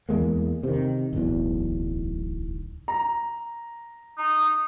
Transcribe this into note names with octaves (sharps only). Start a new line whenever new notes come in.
E2 G#3 A#3
C3 D#3
D1 B1 E2
A#5
D#4